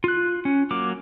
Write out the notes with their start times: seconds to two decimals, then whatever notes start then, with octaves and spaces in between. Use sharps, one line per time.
0.04 F4 F#6
0.45 C#4
0.71 F#3 A#3 D6